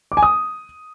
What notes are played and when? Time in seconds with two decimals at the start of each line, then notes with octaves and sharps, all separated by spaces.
0.12 D6
0.17 G#5
0.23 D#6